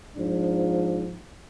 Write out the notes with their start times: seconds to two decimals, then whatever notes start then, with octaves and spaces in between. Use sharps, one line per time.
0.16 G#2 F3 D4